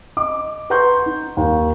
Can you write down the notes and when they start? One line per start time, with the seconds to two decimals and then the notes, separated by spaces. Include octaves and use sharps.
0.17 D#5 D6
0.70 B4 F#5 A#5 C6 C#6 G6
1.06 D#4
1.37 D#2